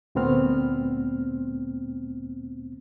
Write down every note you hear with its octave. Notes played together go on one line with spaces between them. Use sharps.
D2 A#2 A3 B3 C4 F6